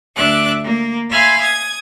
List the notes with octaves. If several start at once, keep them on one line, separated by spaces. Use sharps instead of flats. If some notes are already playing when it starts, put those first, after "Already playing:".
D2 D4 E5 D6 F#6
A#3
E5 F5 G#5 B5 C6
D#6 G#6